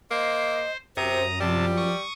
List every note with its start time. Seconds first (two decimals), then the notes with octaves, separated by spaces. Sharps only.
0.11 A#3 C5 D#5
0.97 F#2 C3 C5 A#5 D#6
1.40 C3 F3 G3 A5
1.77 C#6 D#6